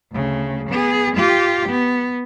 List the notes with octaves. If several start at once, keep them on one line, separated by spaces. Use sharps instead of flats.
D2 C#3
B3 G#4
F4 G4
B3